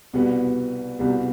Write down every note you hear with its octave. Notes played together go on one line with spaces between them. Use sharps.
C2 B2 G3 B3
C2 B2 G3 B3